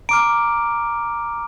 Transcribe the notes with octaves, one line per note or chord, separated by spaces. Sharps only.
A#5 D6 F6 D7